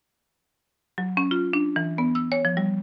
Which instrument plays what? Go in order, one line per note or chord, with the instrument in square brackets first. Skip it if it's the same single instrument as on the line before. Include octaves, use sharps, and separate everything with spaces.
[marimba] F#3
C#4
F4
D4
E3
B3
E6
C#5
F3
G3